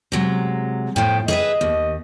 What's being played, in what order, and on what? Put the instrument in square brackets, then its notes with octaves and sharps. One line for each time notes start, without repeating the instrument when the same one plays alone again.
[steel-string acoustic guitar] C3 F#3 G#3
[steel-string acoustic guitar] A2 F3 [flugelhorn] G5
[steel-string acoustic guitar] G#4 B4 E5 [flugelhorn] D#5
[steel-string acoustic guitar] D#2